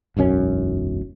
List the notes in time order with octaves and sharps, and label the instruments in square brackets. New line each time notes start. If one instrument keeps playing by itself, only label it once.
[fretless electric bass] E1 B1 F#2 C#4